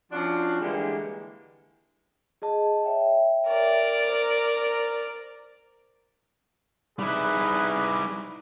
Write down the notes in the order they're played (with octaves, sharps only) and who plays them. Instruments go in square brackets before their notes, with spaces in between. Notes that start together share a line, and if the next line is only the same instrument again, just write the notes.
[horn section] F3 C#4 D4 F4 F#4
D3 E3 G3 G#3 A#3
[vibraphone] G#4 D#5 A5
C#5 E5 G5
[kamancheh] A#4 D5
[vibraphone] C5
[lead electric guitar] G3 E4 [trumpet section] D#4 G#4 B4